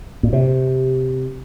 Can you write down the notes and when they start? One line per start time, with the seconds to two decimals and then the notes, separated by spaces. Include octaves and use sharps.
0.23 A#2
0.33 C3